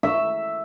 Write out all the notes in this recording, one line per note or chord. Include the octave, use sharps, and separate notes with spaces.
E5